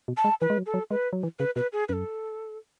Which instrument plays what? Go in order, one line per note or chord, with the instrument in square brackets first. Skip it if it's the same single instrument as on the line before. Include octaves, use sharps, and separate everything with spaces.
[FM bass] B2
[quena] A5
[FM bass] G#3
[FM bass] E3 [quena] B4
[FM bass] G#3
F#3
[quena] A4
[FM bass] F#3
[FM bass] G#3 [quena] B4
[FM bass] F#3
E3
[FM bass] C#3 [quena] B4
[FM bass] B2 [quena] B4
[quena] G#4
[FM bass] F#2 [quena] A4 B4